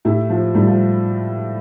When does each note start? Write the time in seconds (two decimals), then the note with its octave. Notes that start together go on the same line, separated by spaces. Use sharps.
0.05 A2 E4 G4
0.30 F3
0.55 A2 G3
0.67 F3